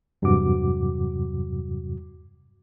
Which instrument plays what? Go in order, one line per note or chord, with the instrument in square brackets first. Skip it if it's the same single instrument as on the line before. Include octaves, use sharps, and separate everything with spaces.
[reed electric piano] E2 G2 C3 F#3 F#4 D6